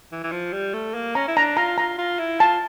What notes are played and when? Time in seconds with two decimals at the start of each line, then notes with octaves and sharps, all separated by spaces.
0.12 E3
0.23 E3
0.32 F3
0.53 G3
0.73 A3
0.95 A#3
1.15 C#4 A#5
1.28 E4
1.37 D4 A#5
1.57 F4 A#5
1.78 F4 A#5
1.98 F4
2.19 E4
2.40 F4 A5